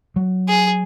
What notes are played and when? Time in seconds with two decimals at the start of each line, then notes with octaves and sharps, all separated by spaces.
0.16 F#3
0.48 G#4